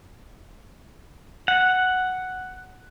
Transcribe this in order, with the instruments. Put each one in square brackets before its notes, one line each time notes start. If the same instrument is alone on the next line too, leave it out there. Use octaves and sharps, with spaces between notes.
[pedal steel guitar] F#5